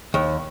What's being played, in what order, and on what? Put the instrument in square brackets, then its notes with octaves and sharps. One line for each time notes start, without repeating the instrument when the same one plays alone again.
[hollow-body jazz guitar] D#2